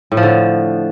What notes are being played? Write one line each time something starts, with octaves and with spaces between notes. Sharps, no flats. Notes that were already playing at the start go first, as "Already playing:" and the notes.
A2
F3
D3